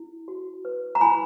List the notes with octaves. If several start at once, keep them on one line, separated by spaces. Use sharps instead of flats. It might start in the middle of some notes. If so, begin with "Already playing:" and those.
Already playing: E4
F#4
B4
A#5
E4 G#5 B5